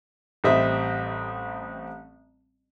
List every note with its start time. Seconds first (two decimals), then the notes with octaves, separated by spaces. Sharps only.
0.44 A1 G3 C4 D#5 E5